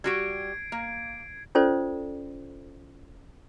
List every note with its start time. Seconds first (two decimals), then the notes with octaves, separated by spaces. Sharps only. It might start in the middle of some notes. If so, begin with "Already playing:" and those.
0.04 G3 F#4 G4 G#6 C7 D7
0.72 A#3
1.55 C#4 F4 A4 C5 D5